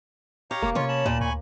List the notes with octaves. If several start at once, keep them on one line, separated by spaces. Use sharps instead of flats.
G4 C#5 F5 A#5
E1 A#3
C3 C#4 F4 C#5
A5 B5
D2 A#2
D2 G#5 B5 C#6